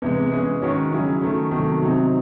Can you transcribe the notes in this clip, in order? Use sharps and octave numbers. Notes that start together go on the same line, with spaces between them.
E2 C3 E3 G#3
E3 G#3 C#4 G#4
D#3 G#3 C#4 F#4 C#5
C#3 F#3 C#4 E4 G#4
D#3 A3 C#4
C3 D#3 F#3 A3
C3 F#3 C4 D#4